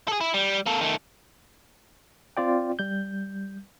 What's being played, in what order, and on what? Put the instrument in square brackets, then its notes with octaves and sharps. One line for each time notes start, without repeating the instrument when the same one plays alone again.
[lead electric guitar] G#4 A4
E4
G3
A#3 A4
D#3 A3
[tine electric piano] C4 F4 D5 G5
G3 G6